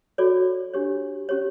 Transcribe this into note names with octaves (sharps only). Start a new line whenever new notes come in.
F#4 A4 C#5 D5
D4 G4 C#5
C#4 G4 C#5